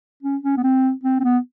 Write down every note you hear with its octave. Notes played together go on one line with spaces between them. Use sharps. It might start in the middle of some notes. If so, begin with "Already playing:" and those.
C#4
C#4
B3
C4
C4
C4
B3